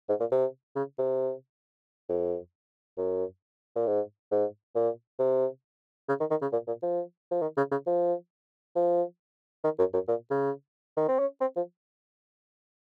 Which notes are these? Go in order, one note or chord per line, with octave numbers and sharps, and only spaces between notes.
G#2
A#2
C3
C#3
C3
F2
F#2
A#2
G#2
G#2
A#2
C3
C#3
D#3
D#3
C#3
A#2
A#2
F3
F3
D#3
C#3
C#3
F3
F3
D#3
F#2
F#2
A#2
C#3
D#3
C4
C#4
C4
F3